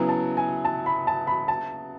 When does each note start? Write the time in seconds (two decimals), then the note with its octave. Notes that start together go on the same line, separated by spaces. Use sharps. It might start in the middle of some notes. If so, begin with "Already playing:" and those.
Already playing: C#3 F#3 B3 E4 G#5
0.09 A5
0.37 G#5
0.65 A5
0.86 B5
1.07 A5
1.27 B5
1.48 A5